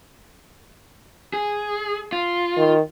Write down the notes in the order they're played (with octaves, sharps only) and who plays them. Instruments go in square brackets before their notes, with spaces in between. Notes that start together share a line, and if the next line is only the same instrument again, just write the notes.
[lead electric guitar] G#4
F4
[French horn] D#3